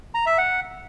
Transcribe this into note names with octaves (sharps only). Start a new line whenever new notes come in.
A#5
E5
F#5